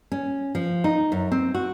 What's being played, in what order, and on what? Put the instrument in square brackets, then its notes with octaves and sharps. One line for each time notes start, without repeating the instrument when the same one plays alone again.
[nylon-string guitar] C#4
F3
D#4
F#2
C4
F#4